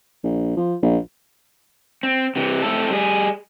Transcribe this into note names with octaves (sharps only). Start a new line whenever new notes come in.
A#1
F3
A#1
C4
C3 E3
A3 C4 E4 A4
G3 G#4